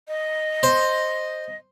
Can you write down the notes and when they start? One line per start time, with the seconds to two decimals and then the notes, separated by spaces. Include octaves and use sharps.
0.08 D#5
0.63 C5